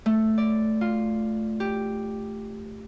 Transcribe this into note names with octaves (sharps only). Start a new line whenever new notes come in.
A3
D5
F4
G4